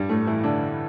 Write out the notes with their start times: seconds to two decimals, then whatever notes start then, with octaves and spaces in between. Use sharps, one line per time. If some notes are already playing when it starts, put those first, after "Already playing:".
Already playing: G2 G3
0.09 A2 A3
0.27 E3 E4
0.44 D3 D4